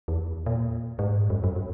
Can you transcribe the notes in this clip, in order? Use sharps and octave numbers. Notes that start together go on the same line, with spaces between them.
E2
A#2
G#2
F#2
F#2
F#2